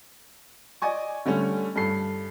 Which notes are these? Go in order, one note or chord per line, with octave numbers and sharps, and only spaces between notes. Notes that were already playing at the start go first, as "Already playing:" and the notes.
D5 D#5 G#5 C#6
D3 G3 A3 C#4
G2 A4 C7